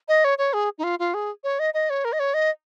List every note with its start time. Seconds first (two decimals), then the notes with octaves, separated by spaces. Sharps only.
0.08 D#5
0.24 C#5
0.38 C#5
0.53 G#4
0.78 D#4
0.84 F4
0.99 F4
1.14 G#4
1.44 C#5
1.59 D#5
1.74 D#5
1.90 C#5
2.05 A#4
2.13 D#5
2.20 C#5
2.34 D#5